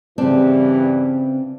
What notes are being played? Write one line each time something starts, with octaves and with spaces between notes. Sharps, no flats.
G2 C#3 E3 G3 C4 D4